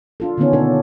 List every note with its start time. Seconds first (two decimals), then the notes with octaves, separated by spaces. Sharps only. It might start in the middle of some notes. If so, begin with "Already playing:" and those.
0.20 D4 F4 A4
0.38 D3 D#3 A#3 B3 C#4 D#4
0.53 B2 D4 A4